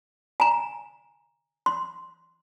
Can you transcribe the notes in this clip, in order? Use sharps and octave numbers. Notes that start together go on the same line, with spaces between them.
G#5 A#5
C6